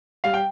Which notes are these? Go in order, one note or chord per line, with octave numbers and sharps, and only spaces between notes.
G3 F5
G5